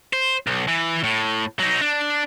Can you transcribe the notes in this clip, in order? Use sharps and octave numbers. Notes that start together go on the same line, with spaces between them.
C5
B1
E3
A2
F#3 D#4
D4